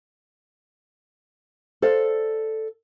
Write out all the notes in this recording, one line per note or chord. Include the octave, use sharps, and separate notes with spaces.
A4 C5 D5 F5